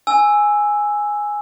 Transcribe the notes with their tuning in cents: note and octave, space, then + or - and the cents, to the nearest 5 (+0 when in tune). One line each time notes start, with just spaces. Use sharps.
G#5 +0 E6 +0